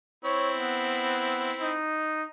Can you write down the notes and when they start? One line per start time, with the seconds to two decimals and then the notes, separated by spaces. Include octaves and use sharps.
0.25 C4 E4 C#5
0.57 B3
1.61 D#4